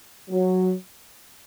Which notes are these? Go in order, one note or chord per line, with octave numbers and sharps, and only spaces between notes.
F#3